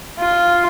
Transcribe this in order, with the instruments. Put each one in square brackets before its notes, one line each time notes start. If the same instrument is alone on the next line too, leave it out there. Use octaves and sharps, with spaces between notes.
[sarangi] F4